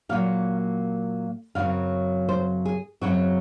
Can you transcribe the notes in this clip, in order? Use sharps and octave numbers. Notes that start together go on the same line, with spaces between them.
A#2 F#3 A#3 F5
F#2 C#3 F#3 C4 F5
C5
G#4
F#2 C#3 F#3 C4 F#4